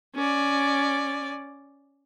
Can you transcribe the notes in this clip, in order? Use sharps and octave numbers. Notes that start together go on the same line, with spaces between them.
C#4 D5